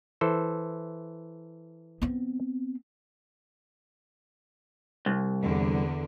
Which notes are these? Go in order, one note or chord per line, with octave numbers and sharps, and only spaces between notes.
E3 A4 C5
B3 C4
C2
E2 D3